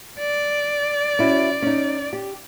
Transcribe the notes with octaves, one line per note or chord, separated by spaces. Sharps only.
D5
C#4 E4 F#4
C#4 D#4
G4